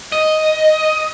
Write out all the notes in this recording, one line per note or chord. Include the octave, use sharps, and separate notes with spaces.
D#5